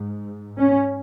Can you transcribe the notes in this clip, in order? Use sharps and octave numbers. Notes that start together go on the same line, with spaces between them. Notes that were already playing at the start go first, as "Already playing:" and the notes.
Already playing: G#2
C#4